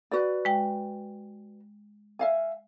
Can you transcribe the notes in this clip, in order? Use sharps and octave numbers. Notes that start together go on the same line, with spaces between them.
F#4 B4 D5
G#3 G5
E5 F5 G#5